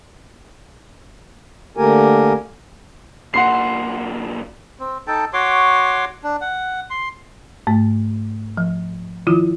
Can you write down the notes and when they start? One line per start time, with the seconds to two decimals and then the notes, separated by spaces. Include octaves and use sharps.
1.77 D3 A3 A#3 G4 A#4 G#5
3.34 B1 A#3 F#5 C6 C7
4.80 C4
5.07 D#4 A4 G5 A5
5.33 F#4 C#5 C6 D6
6.24 D4
6.41 F#5
6.90 C6
7.67 G#2 A3
8.57 F3
9.27 D#3 F3 E4 F4